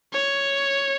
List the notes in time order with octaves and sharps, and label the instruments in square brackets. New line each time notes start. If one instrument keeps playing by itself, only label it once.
[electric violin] C#5